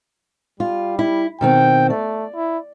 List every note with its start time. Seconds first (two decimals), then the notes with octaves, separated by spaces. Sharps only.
0.60 G3 F4
0.99 E4
1.41 B2 D#3 C4 G5
1.90 A3 D5
2.35 E4